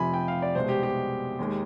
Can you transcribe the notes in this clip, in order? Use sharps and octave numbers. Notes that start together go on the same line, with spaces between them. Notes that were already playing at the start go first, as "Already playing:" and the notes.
Already playing: F1 F2 C3 F3 G#5 B5
G5
F5
D5
C2 B2 G#3 C5
G4
G4
D#2 D#3 G#3